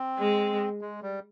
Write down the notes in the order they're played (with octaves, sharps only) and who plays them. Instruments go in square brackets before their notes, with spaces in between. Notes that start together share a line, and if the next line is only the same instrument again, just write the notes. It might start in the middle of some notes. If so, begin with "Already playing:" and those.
Already playing: [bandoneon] C4
[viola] G#3
[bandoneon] G#3
G3